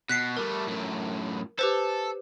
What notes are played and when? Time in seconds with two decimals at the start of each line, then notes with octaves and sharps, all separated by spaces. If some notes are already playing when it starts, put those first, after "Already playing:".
0.09 B2 F#6 B6 C7
0.37 G3 A3 A#4
0.67 F#2 A2
1.59 G4 A4 B4 C5